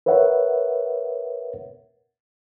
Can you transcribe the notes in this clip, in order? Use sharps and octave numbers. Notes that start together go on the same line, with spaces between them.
A#4 B4 C#5 E5 F#5